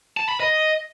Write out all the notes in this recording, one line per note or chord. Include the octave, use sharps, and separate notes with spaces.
A5
B5
D#5